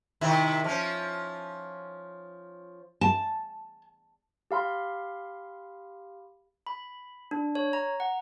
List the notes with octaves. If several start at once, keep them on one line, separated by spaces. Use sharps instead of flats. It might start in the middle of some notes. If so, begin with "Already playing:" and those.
C3 D#3 E4
F3 C#4
A5
G4 F5 B5 C6
B5
D4
C#5
A#5
F#5